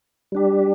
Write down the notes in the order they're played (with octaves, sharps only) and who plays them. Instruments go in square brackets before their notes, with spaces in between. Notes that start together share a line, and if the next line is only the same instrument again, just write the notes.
[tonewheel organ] G3 D4 G4